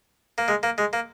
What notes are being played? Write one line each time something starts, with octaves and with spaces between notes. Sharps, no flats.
A#3
G#3
A#3
G#3
A#3